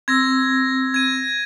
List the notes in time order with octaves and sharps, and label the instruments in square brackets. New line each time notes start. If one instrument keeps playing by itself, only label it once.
[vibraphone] C4 E6 [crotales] G#6 A#6
[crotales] G#6 D#7